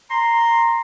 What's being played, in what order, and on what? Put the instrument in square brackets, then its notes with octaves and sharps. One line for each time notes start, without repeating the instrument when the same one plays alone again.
[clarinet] A#5 [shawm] C6